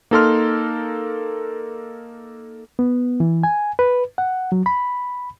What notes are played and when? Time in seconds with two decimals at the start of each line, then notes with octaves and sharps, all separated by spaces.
0.11 A#3 D#4 A4 A#4 C6 F6
2.79 B3
3.20 E3
3.44 G#5
3.79 B4
4.18 F#5
4.52 F#3
4.66 B5